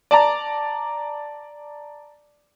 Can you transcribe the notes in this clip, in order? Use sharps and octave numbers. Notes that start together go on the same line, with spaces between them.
D5 A5 A#5